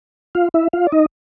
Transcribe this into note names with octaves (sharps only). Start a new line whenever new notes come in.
F4 F5
E4 E5
F4 F5
D5
D#4 D#5